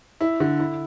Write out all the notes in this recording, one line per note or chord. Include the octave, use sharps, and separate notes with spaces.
E4
D3
E4